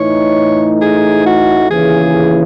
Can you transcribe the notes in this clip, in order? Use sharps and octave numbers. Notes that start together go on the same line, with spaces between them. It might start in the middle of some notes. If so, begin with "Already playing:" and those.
Already playing: A2 E3 A3 D#4 C#5
G#4
F#4
D#2 C#3 E3 G#4